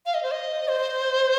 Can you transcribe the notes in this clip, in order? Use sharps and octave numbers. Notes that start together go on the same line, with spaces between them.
F5
D#5
C5
D#5
C5